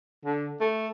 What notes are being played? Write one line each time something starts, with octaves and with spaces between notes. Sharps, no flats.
D3
A3